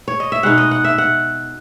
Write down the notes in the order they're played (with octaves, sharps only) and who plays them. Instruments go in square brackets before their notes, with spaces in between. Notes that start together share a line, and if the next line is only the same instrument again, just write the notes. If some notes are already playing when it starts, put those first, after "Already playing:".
[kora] C#5
D#5
E5
B2 G#3 D#4 F#5
D#5
F#5
E5
F#5